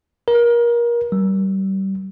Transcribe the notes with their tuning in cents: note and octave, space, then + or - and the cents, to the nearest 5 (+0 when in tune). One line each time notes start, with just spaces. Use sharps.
A#4 +25
G3 -25